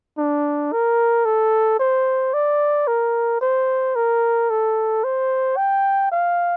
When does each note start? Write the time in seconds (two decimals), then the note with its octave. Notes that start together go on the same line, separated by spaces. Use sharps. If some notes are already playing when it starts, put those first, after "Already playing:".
0.18 D4
0.72 A#4
1.25 A4
1.79 C5
2.34 D5
2.87 A#4
3.41 C5
3.96 A#4
4.50 A4
5.04 C5
5.57 G5
6.12 F5